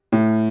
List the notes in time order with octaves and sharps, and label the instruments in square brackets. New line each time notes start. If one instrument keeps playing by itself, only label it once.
[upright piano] A2